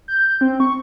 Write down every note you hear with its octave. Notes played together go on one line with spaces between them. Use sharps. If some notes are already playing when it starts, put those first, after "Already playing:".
G6
C4
C#6